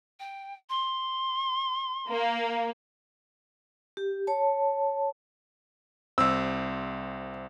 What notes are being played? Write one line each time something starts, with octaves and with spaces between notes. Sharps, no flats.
G5
C6
A#3
G4
C#5 A5
C2 C4 E6